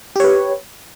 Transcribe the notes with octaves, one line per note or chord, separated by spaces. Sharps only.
G4 B4 C#5